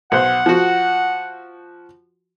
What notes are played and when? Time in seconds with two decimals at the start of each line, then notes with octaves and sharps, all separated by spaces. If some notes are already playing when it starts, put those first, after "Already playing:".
0.12 B1 C5 F#5
0.46 F3 F#4